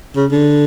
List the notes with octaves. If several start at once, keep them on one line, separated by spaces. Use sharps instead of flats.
C#3
D3